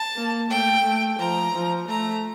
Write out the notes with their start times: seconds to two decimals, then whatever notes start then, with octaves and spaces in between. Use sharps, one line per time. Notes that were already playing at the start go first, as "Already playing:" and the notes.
Already playing: A5
0.16 A#3
0.50 A3 G5
0.85 A3
1.19 F3 A#5
1.54 F3
1.88 A3 A#5